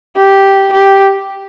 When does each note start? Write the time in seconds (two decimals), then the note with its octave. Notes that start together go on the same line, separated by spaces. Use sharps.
0.16 G4
0.72 G4